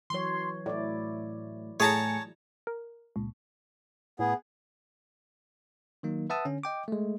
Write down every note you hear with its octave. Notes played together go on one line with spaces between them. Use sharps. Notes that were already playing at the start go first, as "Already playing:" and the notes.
E3 F#3 C#5 C6
A2 E4 D5
A2 G#4 C#5 A5 A#5 C#7
A#4
C#2 A#2
A2 B3 G#4
D#3 F#3 A#3 D#4
B4 E5 F#5 A5 D#6 E6
D3 C#4
D#5 G5 D6
G#3 A3